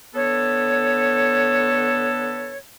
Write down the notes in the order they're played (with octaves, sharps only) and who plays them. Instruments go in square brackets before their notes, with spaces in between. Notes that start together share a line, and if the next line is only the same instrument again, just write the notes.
[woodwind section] D3 B3 A4 B4 C#5